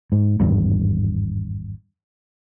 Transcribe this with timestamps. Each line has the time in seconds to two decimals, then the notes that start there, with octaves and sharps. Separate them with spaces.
0.12 G#2
0.40 G#1 E2 G2